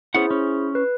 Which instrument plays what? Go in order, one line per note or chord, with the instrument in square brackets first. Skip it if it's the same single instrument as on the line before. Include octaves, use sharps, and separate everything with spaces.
[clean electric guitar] B3 C#4 F#5 [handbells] E4 G#4 C5
[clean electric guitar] C#4
[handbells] B4